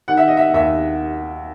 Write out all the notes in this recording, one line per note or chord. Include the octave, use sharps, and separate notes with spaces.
D#3 F#5
E5
D#5
E5
D#2 E5